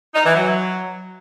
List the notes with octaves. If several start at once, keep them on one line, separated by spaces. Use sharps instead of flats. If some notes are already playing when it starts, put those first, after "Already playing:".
D#4
E3
F#3